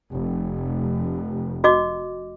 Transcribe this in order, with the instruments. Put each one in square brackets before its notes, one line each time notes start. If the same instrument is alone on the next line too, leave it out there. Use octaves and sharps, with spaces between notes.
[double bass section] F1
[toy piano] F#4 D#5 D6